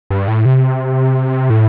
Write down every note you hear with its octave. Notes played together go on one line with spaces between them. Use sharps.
G2
A2
C3
A2